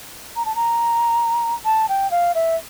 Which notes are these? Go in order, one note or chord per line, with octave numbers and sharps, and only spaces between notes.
A#5
A5
A#5
A5
G5
F5
E5